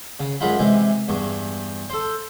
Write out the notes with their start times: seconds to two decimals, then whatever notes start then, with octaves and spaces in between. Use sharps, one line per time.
0.20 C#3
0.40 F#2 G#3 F4 F#5 B5
0.59 C3 E3 G#3
1.08 E2 G2 C#6
1.90 A4 C5